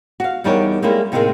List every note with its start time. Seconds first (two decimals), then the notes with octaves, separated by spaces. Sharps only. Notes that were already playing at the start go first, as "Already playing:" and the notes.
0.20 F#4 F5
0.44 E2 G3 D4 D#4 A#4 C#5
0.82 G3 G#3 A#3 C#4 E4 A4
1.12 A2 C3 D#3 F#3 G#3 A#3